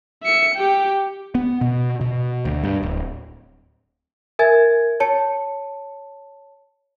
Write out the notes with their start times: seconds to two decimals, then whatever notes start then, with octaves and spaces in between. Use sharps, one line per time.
0.23 E5 C#7
0.55 G4 G5
1.35 B3
1.61 B2
2.01 B2
2.45 D2
2.63 G2
2.83 D1
4.39 A#4 E5 G#5 G#6 A6
5.00 C#5 A5 C#7